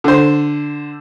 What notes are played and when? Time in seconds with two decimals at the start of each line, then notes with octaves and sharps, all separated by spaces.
0.04 D3 C5